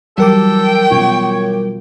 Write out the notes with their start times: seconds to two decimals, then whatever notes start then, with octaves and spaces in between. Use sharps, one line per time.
0.18 E3 F#3 G3 A4 A#4 G5 D6
0.91 B2 C#4 F4 C#5